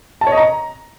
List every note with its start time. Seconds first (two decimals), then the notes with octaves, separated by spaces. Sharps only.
0.21 A5
0.27 C#5
0.32 D#5
0.37 A#5